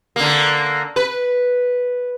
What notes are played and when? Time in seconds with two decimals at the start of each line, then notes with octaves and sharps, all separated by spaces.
0.16 D3 A#3
0.96 B4